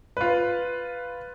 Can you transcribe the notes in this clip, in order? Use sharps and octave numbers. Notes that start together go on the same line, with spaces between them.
F4 B4